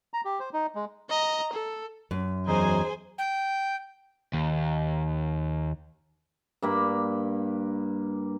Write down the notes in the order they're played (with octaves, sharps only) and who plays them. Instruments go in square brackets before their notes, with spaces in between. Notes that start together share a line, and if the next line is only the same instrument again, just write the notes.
[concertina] A#5
G4
C5
D#4
G#3
[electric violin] D#5 A#5
A4
[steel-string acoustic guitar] F#2
[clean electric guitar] E2 F#3 [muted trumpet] D#4 [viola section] G#4 C5 G#5
[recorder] G5
[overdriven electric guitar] D#2
[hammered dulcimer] G2 A#3 B5